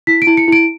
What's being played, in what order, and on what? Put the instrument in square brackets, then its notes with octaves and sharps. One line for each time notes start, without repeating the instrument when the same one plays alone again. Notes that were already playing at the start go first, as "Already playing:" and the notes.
[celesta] E4 B6
D7
E4
C#7
E4 D7